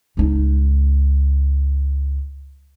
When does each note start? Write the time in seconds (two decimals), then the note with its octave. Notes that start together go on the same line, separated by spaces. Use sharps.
0.17 C#2 D#4